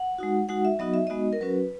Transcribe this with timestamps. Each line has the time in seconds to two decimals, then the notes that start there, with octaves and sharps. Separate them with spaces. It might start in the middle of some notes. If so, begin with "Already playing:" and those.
Already playing: F#5
0.18 G#3 D#4 F#4
0.49 G#3 D#4 F#4 F#5
0.65 E5
0.79 F#3 B3 D#4 F#4 D#5
0.94 E5
1.07 G#3 B3 D#4 F#4 D#5
1.33 A#4
1.41 F#3 C#4 F#4 B4